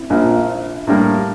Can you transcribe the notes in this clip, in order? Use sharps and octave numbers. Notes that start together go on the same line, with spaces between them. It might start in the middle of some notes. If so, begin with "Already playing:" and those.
Already playing: C4 E4
A#1 A#2 F3 A#3 D4
A2 G3 A#3 D4